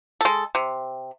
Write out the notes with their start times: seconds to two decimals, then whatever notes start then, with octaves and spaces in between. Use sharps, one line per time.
0.21 G#3 A4
0.55 C3